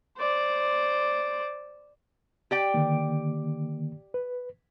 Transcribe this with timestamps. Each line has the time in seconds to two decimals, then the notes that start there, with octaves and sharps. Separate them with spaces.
0.18 C5 D5
2.51 G4 D5 G5
2.74 D3 D#3 A#3
4.14 B4